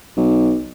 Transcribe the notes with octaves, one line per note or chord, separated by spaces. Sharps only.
B1